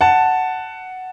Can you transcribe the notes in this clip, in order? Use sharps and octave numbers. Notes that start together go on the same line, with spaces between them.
F#5 A5